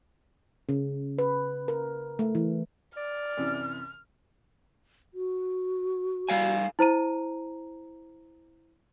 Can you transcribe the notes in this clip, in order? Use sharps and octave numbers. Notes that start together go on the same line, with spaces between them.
C#3
B4
A#4
A3
E3
D5 F6
F#2 C3 E3
F#4
G3 F5 G#5
E4 C5 A#5 D#7